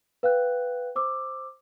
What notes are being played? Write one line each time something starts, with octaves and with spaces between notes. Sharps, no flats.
B4 F5 G5 F#6
C5 D6 E6